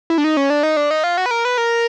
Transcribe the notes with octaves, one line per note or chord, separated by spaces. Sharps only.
E4
D4
D#4
C#4
D4
D#4
D4
D#4
F4
F#4
B4
A#4
B4
A#4